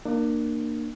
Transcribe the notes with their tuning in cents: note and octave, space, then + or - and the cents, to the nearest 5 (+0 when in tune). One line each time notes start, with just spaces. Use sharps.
A#3 +0 D4 +35